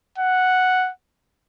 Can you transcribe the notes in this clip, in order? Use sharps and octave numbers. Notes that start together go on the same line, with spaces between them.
F#5